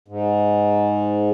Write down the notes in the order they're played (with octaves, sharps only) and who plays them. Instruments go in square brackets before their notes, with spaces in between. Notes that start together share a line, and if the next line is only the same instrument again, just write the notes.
[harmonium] G#2